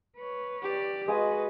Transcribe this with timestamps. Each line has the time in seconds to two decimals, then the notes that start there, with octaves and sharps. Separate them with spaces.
0.16 B4 C#5
0.63 G4 D5
1.08 G#3 F#4 B4 D#5 G#5 D#6